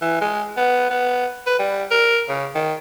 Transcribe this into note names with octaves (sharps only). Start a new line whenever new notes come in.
E3
G#3
B3
B3
B4
G3
A#4
C#3
D#3